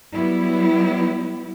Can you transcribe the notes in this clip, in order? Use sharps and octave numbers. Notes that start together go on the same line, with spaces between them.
F#3 G3 B3 E4